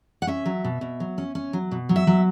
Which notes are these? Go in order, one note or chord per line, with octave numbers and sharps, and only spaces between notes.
F#5
C#4 E5
F#3
B2
B2
F#3
C#4
C#4
F#3
B2
F#3
E5
F#3